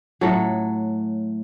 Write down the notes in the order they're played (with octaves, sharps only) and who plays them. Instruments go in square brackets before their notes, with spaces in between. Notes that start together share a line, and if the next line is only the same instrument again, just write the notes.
[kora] A2 F#3 A4